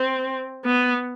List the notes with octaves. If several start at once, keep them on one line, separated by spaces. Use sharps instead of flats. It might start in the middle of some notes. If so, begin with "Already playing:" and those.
Already playing: C4
B3